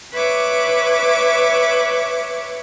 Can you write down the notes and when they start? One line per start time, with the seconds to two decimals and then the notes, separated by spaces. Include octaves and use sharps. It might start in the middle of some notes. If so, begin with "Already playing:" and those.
0.12 B4 C#5 E5 D6